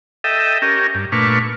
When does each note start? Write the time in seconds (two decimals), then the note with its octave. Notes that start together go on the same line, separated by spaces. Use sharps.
0.24 A4 D#5 E5 G5
0.62 C#4 G4 A#4
0.95 G2
1.12 A#2 A3 D4 B4 C#6 F6